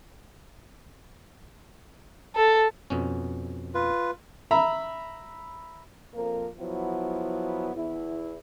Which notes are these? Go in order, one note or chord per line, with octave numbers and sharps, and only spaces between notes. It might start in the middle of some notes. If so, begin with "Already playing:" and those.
A4
F2 B2 C#4
F4 B4
E5 A#5 B5
F2 F3 A#3 A#4
F3 F#3 B3 E4
E2 E4